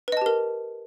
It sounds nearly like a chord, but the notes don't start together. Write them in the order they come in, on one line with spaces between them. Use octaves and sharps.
B4 D#5 A5 G4 A#4